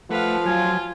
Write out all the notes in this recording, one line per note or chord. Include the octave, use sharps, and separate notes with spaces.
F3 A3 B4 F5 F#5
F#3 F4 G#5